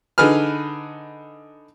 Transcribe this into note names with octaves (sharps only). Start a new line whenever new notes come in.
D3 D#4 G#4 B4 F6